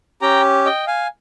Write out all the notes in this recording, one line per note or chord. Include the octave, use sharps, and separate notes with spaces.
C#4 G4 G5 A#5
D#5 G5
F5 G#5